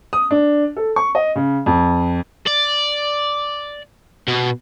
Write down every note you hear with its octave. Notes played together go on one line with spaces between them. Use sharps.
D#6
D4
A4
C#6
D#5
C#3
F2
D5
B2